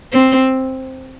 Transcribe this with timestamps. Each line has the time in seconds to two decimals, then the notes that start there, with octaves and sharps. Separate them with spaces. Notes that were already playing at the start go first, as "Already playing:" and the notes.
0.13 C4